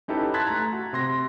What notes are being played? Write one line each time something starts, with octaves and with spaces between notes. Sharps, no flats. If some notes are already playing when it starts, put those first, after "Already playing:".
C#4 D#4 E4 G4 A4 B4
A5 C6 F#6 G#6 A6 B6
A3 A#5
F#4
C3 C6 A#6